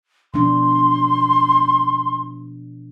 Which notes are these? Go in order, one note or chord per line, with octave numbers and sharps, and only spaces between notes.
B2 F3 D4 C6